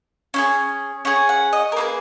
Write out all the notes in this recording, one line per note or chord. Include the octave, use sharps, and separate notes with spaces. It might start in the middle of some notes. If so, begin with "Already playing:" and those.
C#4 E4 G#4
C#4 G#4 F#5
F#5
D#5
A#4
A#3 E4 G#4 B4